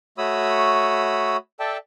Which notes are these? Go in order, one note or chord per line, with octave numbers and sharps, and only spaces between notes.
A3 F#4 C#5 B5 D#6 E6
A4 D5 E5 G5 A5